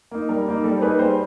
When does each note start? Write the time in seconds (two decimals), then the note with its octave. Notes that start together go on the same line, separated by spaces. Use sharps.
0.11 A#3 D#4
0.29 G3 A#4
0.47 A#3 D#4
0.64 G3 A4
0.77 C5
0.82 A#3 D#4 G#4 B4 C#5
0.99 G3 C5